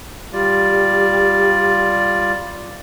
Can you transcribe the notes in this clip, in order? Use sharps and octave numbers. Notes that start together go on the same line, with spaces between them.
G3 F4 G4 D5